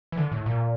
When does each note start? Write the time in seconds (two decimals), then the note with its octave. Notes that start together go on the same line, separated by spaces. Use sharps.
0.12 E3
0.17 D3
0.32 A2
0.46 A#2